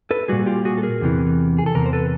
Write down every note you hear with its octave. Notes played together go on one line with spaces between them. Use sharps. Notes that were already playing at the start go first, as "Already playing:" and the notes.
A4 B4
A#2 G3 F#4 G#4
F4 G4
F#4 G#4
A4
G#4 A#4
E2 C3 E3
G#4
A4
E2 C3 A#4
C5
A4 B4